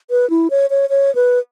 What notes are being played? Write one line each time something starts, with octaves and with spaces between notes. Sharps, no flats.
B4
E4
C#5
C#5
C#5
B4